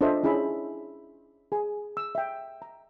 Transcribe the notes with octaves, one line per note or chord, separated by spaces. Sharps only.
D4 F4 A4 C5 D#5 E5
C#4 E4 G#4 E5 B5
G#4 G#5
E6
E5 G5
A#5